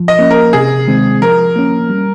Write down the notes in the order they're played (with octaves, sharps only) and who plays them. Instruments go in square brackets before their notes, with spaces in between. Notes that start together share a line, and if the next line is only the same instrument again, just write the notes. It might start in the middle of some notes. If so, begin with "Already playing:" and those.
Already playing: [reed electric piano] F3
[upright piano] D#5
[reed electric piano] A#3 C#4
[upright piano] A#4
[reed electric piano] C3 [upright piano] G#4
[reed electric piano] D#3 G#3 C4
[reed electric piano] F3 [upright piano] A#4
[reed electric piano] A#3 C#4
G3